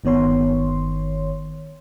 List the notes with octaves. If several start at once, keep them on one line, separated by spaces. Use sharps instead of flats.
G1 D#3 B3 C#5 C6